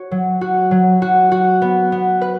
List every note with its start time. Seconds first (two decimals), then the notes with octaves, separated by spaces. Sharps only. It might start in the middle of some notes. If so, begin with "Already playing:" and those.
Already playing: F#4 C#5
0.11 F#3
0.41 F#4
0.71 F#3
1.02 F#4
1.32 F#4
1.62 B3
1.92 B3
2.21 B4